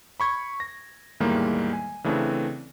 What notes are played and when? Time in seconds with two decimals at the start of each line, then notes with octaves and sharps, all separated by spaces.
0.20 B5 C#6 G#6
0.60 A#6
1.20 E2 A2 D#3 G3 G#3 A#3
1.73 G#5
2.04 C#3 E3 A3 C4 D4